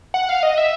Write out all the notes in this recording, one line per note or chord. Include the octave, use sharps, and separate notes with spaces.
F#5
F5
D#5
E5